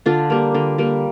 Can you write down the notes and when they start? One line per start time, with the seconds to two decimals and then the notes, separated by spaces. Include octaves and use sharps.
0.06 D3 D4 F4
0.30 G3 A#3
0.55 D3
0.78 G3 A#3